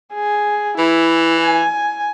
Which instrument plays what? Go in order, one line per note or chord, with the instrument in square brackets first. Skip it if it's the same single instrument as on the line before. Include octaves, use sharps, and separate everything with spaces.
[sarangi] G#4
[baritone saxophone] E3 [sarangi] E4
[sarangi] G#5